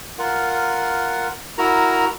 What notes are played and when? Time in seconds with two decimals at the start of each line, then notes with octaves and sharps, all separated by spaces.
0.19 F4 A#4 F#5
1.58 E4 F#4 A#4 A#5